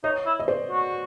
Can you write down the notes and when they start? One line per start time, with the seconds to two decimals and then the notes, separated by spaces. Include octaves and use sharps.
0.04 D#4 C#5 D#5
0.26 E4
0.40 D#5
0.48 C5 D5
0.71 F#4